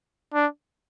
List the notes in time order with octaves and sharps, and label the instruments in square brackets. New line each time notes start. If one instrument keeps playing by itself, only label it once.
[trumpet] D4